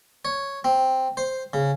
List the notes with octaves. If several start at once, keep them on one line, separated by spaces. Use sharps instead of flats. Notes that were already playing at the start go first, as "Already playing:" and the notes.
C#5
C4
C5
C#3